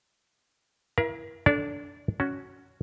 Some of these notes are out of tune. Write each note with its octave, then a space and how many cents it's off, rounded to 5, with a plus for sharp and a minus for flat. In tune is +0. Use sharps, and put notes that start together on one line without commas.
E4 +5 A#4 +35 F5 -35
D4 -10 A4 -5 D5 -35
C#4 +10 F#4 +0